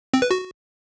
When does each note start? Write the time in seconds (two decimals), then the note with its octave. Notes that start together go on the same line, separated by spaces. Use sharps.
0.14 C4
0.22 B4
0.31 F#4